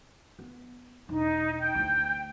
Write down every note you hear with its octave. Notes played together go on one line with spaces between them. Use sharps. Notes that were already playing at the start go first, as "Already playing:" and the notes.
B3
E1 D#4
G5 G6
D2 E4